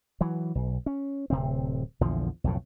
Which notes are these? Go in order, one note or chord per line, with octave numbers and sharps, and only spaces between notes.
E3 F#3
B1
C#4
D1 C3 C4
A#1 E2 D3 F3
B1 F2 A2 C#3